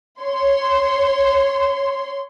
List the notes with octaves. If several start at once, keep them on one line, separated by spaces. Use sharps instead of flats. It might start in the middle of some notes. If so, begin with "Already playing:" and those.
C#5 C6